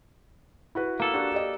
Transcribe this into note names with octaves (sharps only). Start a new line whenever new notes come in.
E4 F#4 B4
A#3 A4
D4 F#4 G4
G4 D5 D#5